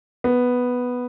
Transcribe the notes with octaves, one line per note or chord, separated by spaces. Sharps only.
B3